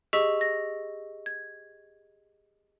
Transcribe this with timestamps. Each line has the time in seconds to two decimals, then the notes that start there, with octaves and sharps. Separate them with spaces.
0.13 G4 G#4 D#5 C#6 E6 B6
0.41 A#6
1.26 G#6